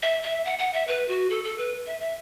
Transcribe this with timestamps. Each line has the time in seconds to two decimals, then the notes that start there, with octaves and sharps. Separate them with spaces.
0.03 E5
0.23 E5
0.45 F#5
0.58 F#5
0.73 E5
0.87 B4
1.08 F#4
1.30 A4
1.44 A4
1.58 B4
1.86 E5
2.00 E5